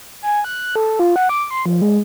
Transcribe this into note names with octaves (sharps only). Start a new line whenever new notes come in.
G#5
F#6
A4
F4
F#5
D6
C6
F3
G#3